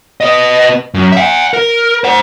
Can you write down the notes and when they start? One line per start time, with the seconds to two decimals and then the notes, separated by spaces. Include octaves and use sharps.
0.21 B3 D#5
0.94 F#2
1.12 E5 F#5
1.53 A#4
2.04 C5 F#5